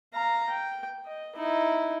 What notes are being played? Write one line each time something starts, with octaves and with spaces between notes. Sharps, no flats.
F5 A#5
G5
D#5
D#4 E4